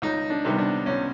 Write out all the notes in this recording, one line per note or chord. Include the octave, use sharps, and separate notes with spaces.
C#2 D#4
D4
C3 D#3 G3 B3
D4
C#2 C#4